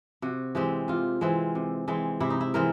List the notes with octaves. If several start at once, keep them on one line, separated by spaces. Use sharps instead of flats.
C3 F#4
E3 G#3 C4 G4
C3 F4
E3 G#3 C4
C3
E3 G#3 C4
C3 E4
D#4
E4
E3 G#3 C4 A#4